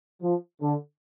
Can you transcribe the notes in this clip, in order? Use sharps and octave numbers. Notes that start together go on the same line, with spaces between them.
F3
D3